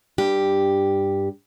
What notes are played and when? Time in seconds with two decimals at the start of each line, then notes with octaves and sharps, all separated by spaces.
0.18 G2 G4